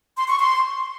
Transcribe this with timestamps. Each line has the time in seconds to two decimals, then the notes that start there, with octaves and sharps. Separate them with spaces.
0.17 C6
0.28 C#6
0.39 C6